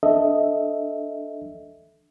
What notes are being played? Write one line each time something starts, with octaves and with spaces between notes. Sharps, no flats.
D4 A4 D#5 E5